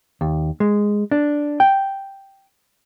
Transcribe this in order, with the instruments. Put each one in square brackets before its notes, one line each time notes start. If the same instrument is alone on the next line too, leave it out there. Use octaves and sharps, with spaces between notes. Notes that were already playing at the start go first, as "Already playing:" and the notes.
[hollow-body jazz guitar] D#2
G#3
D4
G5